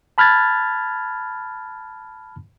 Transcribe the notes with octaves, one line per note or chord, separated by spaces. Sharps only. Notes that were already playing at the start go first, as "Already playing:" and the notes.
A5 B5 F6 F#6 G#6 A6